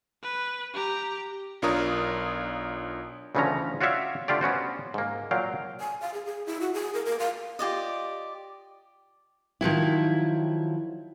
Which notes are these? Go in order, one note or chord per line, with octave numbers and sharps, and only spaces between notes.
B4
G4 A#5
B1 D4 F4 A#4 C#5 D#6
D2 C#3 E3 F3 C#4 A#5
F4 F#4 C#5 D5 E5 F5
D3 A3 F4 G4 D5
B3 C#4 F#4 C5
G#2 A#3
A#2 F#3 F5 G5
G#5
F5
G#4
G#4
E4
F#4
G#4
A#4
A#4
F5
F4 G4 D5 D#5
D#3 F3 F#3 E4